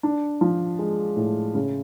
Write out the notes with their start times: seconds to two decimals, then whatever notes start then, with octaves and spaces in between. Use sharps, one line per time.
0.03 D4
0.41 F3
0.79 G#3
1.16 A2
1.55 C#3